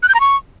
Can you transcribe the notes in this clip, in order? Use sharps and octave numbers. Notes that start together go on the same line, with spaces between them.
F#6
G6
A#5
C#6